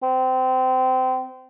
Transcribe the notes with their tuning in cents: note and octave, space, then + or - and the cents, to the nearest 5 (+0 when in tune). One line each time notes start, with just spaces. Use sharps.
C4 -25